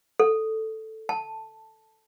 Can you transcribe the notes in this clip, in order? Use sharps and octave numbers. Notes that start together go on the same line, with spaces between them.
A4
A5